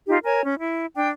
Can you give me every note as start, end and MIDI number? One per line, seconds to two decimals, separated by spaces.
0.08 0.18 63
0.08 0.18 65
0.08 0.18 67
0.24 0.41 70
0.24 0.41 73
0.24 0.41 80
0.43 0.54 61
0.59 0.85 64
0.95 1.09 62
0.95 1.09 79